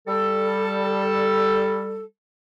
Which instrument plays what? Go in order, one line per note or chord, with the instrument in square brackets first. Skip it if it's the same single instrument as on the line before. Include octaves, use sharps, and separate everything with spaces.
[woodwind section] G3 A4